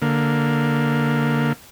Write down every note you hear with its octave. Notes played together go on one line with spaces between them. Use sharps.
D3 A#3